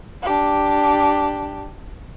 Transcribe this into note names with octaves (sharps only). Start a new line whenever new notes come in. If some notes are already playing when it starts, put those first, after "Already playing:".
D4 G4